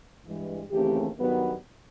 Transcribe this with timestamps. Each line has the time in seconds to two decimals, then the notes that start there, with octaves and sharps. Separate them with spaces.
0.24 G2 E3 G#3
0.71 D#2 C#3 E3 A3 C4 G4
1.17 G2 D#3 F#3 B3